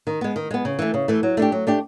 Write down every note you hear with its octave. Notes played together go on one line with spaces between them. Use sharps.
D#3
G#3 B3
D#3
G#3 B3
C#3
E3 A3
C#3
E3 A3
F#3
A3 D4 G4
F#3
A3 D4 G4